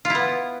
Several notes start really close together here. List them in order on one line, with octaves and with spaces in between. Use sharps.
F4 E4 B3